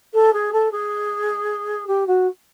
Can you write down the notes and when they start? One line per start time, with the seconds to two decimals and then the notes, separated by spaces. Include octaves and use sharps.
0.13 A4
0.33 G#4
0.52 A4
0.71 G#4
1.87 G4
2.06 F#4